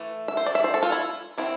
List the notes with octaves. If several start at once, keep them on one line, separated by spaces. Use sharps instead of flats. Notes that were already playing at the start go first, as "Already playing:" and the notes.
Already playing: E3 A3
E5
C5
D5
E5
C5
A4
F4
E4
G3 C4 E4